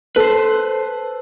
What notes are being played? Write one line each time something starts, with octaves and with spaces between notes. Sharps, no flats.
A4 B4 C5